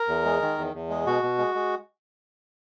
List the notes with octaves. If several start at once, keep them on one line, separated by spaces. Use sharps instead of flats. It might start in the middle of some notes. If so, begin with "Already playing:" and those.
Already playing: A#4
E2
G#3
D#3
E2
E2
G#3
B2 F#4
B2
G#3
G#3